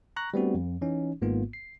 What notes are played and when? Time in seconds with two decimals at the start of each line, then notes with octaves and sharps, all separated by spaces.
0.16 A#5 C#6 F#6 A#6
0.34 G3 A3 B3 C4 D4 F#4
0.55 F2
0.81 E3 C#4 D#4
1.22 G#1 G#2 A#3 B3 F4
1.53 C7